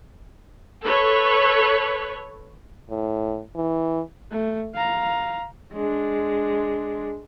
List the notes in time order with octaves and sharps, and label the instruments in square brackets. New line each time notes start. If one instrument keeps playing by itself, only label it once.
[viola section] A4 B4 C#5
[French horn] A2
E3
[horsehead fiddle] A3
F5 A#5
G#3 D4